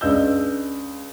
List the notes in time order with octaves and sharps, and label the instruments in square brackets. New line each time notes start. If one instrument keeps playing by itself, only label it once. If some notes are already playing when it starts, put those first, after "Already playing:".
[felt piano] C#2 D4 D#5 E6 G6